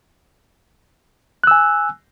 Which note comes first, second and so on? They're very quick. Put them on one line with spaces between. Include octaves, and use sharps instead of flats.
F#6 E6 G#5